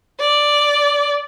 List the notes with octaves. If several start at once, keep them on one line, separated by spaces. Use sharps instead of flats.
D5